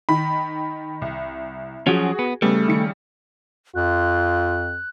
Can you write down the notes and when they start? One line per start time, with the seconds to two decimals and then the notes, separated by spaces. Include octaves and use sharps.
0.09 D#3 B5
1.02 C2
1.87 F3 F#3 C#4 F#4 G#4
2.19 B3
2.42 C#3 G3 A3 B3
2.68 D#3 C#7
3.76 F2 F4 F#6